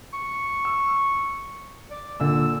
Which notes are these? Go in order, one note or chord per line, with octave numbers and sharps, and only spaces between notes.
C#6
E6
D5
A#2 D3 E6